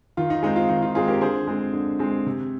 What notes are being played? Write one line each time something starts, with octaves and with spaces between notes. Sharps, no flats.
D#3 F4
D#4
G#3 C4 D#4
F4
D#3 D#4
F4
G#3 C4 F4 G#4
G4 A#4
D3 G#4 C5
G#3 C4
D3
G#3 C4
C3